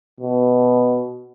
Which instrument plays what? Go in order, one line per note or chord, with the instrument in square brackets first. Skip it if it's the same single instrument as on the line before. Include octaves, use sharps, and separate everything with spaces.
[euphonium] B2